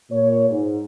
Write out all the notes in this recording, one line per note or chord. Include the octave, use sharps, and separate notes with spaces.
A#2 C#5
G#2